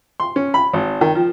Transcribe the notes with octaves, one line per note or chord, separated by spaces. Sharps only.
C6
C#4
B5
G#1
D#3
F3